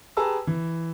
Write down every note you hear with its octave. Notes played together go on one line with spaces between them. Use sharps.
G4 G#4 B4 A5 A#5 E6
E3